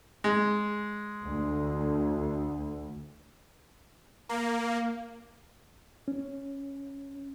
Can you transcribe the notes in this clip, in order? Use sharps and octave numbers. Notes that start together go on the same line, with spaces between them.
G#3
D2
A#3
C#4